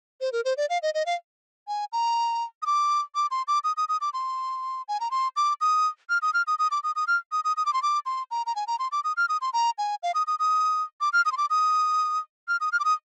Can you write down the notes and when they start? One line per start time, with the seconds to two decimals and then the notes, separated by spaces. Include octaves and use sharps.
0.21 C5
0.32 A#4
0.45 C5
0.57 D5
0.70 F5
0.82 D#5
0.94 D#5
1.06 F5
1.68 G#5
1.92 A#5
2.62 D#6
2.66 D6
3.15 D6
3.31 C6
3.48 D6
3.64 D#6
3.77 D#6
3.89 D#6
4.01 D6
4.13 C6
4.88 G#5
5.00 A#5
5.11 C6
5.36 D6
5.61 D#6
6.09 F6
6.22 D#6
6.34 F6
6.47 D#6
6.59 D#6
6.71 D6
6.83 D#6
6.96 D#6
7.07 F6
7.32 D#6
7.44 D#6
7.57 D#6
7.66 D6
7.73 C6
7.83 D6
8.06 C6
8.31 A#5
8.46 A#5
8.56 G#5
8.67 A#5
8.79 C6
8.92 D6
9.04 D#6
9.17 F6
9.29 D#6
9.41 C6
9.53 A#5
9.78 G#5
10.03 F5
10.14 D#6
10.27 D#6
10.39 D#6
11.01 D6
11.13 F6
11.25 D#6
11.32 C6
11.37 D6
11.50 D#6
12.48 F6
12.60 D#6
12.72 F6
12.80 D6
12.85 D#6